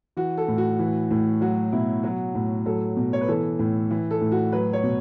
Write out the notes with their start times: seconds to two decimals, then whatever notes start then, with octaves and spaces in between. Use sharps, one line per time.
0.17 E3 F#4
0.38 A4
0.48 A2
0.58 F#4
0.79 E3
1.11 A2
1.41 F#3 F#4
1.72 B2 E4
2.03 F#3 F#4
2.35 A2
2.66 F#3 A4
2.97 B2
3.13 C#5
3.21 B4
3.28 E3 A4
3.59 A2
3.91 E3
4.11 A4
4.21 A2
4.32 F#4
4.52 F#3 B4
4.73 C#5
4.83 B2